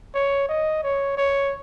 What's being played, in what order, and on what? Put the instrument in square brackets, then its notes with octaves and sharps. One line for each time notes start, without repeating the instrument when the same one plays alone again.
[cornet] C#5
D#5
C#5
C#5